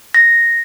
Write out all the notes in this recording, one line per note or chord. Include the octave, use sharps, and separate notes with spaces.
A#6